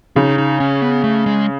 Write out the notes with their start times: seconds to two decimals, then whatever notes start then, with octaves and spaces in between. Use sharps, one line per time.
0.16 C#3 D#4
0.38 D#4
0.60 C#4
0.82 B3
1.04 A3
1.26 G#3